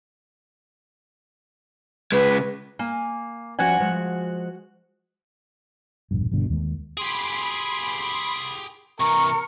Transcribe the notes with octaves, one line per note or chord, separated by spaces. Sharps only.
C#3 G#3 B4
A#3 G#5
F3 C#4 F#4 D5 F#5 G#5
F3 G#3
E1 A#1 G2
G1 G2 B2 D3
D#2 D#3 G#3
G4 G#4 B5 C6 D7
C3 E3 A#4 C#6 C#7